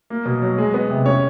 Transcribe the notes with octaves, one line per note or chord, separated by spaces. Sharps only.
A#3
B2
F#3
G#3
B3
C3
C#4 C#5